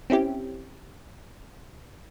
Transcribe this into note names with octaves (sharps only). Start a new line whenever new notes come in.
C4 C#4 E4 G4